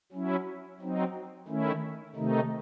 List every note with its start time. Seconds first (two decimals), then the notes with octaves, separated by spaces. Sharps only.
0.12 F#3 C#4 E4
0.80 F#3 C4 D#4
1.48 D#3 A3 C#4 E4
2.16 C3 D#3 A3 D#4